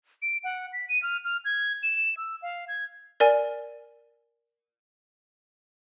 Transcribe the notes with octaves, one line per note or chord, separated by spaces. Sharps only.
D7
F#5
B6
D#7
F6
F6
G#6
E7
E6
F5
G#6
A#4 D5 G#5